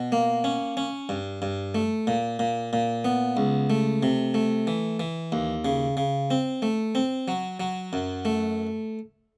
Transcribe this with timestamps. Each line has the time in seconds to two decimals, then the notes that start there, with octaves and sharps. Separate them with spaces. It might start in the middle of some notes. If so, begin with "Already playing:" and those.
Already playing: B2
0.12 A#3
0.44 C#4
0.77 C#4
1.09 G2
1.42 G2
1.75 A3
2.07 A#2
2.39 A#2
2.73 A#2
3.05 B3
3.37 C#2
3.70 A3
4.03 C3
4.34 A3
4.67 E3
5.00 E3
5.32 D#2
5.65 C#3
5.97 C#3
6.31 C4
6.62 A3
6.95 C4
7.28 F#3
7.60 F#3
7.93 F#2
8.25 A3